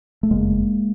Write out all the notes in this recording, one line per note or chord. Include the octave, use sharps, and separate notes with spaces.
A3
F#1 F2 C#3 G#3 A#3